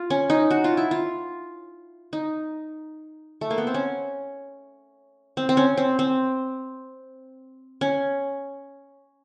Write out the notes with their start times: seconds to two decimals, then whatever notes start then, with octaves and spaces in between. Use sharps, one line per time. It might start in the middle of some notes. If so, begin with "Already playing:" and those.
Already playing: F4
0.10 C#4
0.30 D#4
0.51 F#4
0.64 F4
0.77 E4
0.91 F4
2.13 D#4
3.41 A3
3.50 A#3
3.58 B3
3.67 C4
3.74 C#4
5.37 C4
5.49 C4
5.57 C#4
5.77 C4
5.99 C4
7.81 C#4